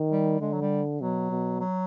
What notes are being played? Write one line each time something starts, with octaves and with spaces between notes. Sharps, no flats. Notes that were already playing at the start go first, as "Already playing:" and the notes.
Already playing: D#3
G3
D3 G#3
F#3
G3
B2 F#3
B2
F#3